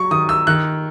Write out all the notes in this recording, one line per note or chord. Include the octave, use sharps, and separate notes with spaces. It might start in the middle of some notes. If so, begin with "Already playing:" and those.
Already playing: F#3 C#6
D#3 D#6
E6
D#3 F#6